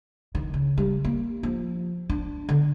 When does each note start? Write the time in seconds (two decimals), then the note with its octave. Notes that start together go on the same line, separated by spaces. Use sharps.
0.35 D#3
0.54 C#3
0.78 G3
1.04 A#3
1.43 F3
2.10 D4
2.49 D3